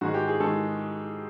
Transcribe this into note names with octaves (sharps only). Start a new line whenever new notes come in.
G#2 D#3 G#3 F#4
G4
G#4
D#3 G#3 A4